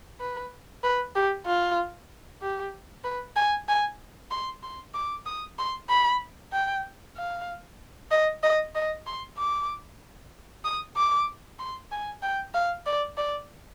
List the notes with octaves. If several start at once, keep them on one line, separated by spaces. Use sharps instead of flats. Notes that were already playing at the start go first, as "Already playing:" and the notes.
B4
B4
G4
F4
G4
B4
G#5
G#5
C6
C6
D6
D#6
C6
B5
G5
F5
D#5
D#5
D#5
C6
D6
D#6
D6
C6
G#5
G5
F5
D5
D5